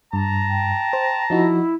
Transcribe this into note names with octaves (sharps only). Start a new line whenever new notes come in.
G2 A5 A#5
G5
C5
F3 D#4 E4 F#4